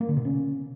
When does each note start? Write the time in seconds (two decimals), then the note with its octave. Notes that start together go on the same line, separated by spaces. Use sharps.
0.01 A#3
0.09 D3
0.17 B2
0.25 C#4